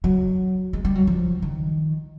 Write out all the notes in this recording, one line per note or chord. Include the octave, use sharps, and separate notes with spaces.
F#3
G#3
G3
F#3
F3
D#3